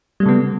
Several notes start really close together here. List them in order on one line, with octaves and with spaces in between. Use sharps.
G3 A3 C#3 B3